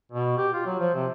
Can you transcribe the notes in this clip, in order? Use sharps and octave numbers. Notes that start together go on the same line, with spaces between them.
B2
G4
F4
F#3
F3
C3